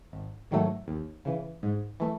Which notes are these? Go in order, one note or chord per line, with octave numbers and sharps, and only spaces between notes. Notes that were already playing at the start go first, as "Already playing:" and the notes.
G#1
G#2 D#3 F#3 A3
D#2
C#3 E3
G#2
E3 A3